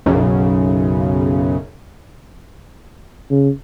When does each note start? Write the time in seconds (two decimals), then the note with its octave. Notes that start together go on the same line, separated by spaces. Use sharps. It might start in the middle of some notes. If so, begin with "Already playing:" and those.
0.06 B1 F#2 C#3
3.31 C#3